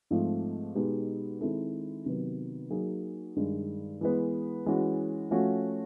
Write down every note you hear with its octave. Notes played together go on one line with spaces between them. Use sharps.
G#2 F3 A3 C4
B2 G#3 B3 D#4 G4
D#3 G#3 C4 E4 A4
C3 D#3 F#3 B3
F#3 A#3 D#4 G#4
G2 D#3 G#3
E3 G#3 B3
E3 G#3 C#4 F#4
F3 A3 C#4 F#4